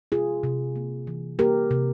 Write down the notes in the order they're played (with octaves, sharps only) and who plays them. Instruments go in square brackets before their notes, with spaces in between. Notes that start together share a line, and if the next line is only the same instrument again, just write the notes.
[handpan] C3 F4 G#4
C3
A#3
E3
A#3 G4 A#4
C3